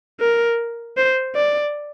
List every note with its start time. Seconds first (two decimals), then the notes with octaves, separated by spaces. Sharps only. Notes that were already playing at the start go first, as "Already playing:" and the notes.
0.20 A#4
0.97 C5
1.35 D5